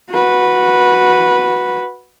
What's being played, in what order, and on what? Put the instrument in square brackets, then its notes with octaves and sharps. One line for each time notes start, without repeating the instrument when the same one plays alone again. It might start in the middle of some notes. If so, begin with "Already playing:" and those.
[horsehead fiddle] F#4 B4